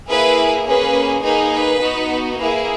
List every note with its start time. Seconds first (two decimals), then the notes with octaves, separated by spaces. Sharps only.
0.10 A#3 E4 G#4 B4
0.67 A#3 C#4 G#4 B4
1.24 A#3 D#4 G#4 B4
1.53 B4
1.81 B3 D#4 F#4
2.38 A#3 E4 G#4 B4